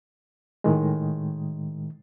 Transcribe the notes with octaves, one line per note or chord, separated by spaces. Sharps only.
A2 D#3 G#3